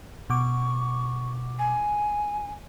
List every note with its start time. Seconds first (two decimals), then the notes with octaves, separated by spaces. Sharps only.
0.30 B2 C#6 D6
1.59 G#5